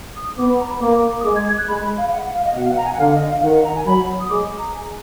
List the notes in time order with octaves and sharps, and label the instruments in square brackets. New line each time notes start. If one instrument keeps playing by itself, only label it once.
[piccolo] D#6
[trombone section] B3 [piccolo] D6
[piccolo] B5
A#5
B5
[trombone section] A#3 [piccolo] D6
[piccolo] D#6
[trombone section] G#3 [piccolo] D6
[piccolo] G#6
G#6
F#6
[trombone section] G#3 [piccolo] B5
[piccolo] B5
F5
F5
F#5
F5
D#5
[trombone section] B2 [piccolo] F#5
[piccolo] F5
F#5
A#5
G#5
F#5
[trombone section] D3 [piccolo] F5
[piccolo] D#5
F5
[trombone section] D#3 [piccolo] F#5
[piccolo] F#5
A#5
G#5
[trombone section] F#3 [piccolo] B5
[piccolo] D#6
[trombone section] G#3 [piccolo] D6
[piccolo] A#5
G#5